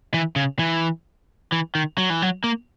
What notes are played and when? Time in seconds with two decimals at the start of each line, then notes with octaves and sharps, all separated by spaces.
0.14 E3
0.36 C#3
0.59 E3
1.52 E3
1.75 D#3
1.98 F#3
2.10 E3
2.22 F#3
2.44 A#3